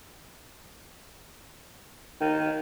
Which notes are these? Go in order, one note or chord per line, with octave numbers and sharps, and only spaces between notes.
D#3